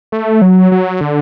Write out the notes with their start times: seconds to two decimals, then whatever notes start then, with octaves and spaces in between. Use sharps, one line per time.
0.12 A3
0.42 F#3
0.72 F#3
1.01 D3